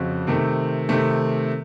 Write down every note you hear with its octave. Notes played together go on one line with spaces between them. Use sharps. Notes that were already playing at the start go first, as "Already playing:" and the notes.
Already playing: F2 C#3 C4 F#4
C3 D#3 A3 C4
C3 D#3 A3 C4